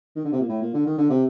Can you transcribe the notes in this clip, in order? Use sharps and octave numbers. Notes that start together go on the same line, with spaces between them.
D#3
D3
C3
A#2
A2
A#2
D3
D#3
D3
C3